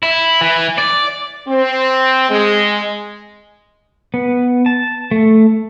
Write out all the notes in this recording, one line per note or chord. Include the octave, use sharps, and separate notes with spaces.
E4
E3
D5
C4
G#3
B3
A5
A3